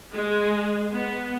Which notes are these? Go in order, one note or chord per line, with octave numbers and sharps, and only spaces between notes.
G#3
B3